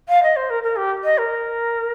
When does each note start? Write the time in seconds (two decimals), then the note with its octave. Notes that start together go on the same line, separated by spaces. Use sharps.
0.09 F5
0.23 D#5
0.36 C5
0.50 A#4
0.63 A#4
0.76 G4
1.04 D#5
1.18 A#4